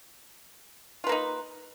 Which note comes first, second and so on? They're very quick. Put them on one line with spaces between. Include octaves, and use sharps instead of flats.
F4 B4 A#3 D#4